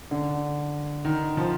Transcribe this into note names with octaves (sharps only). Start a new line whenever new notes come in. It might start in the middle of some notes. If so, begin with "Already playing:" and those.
D3
D#3
F3